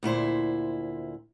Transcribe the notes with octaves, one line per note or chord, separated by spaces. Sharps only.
D2 A#2 E4 C5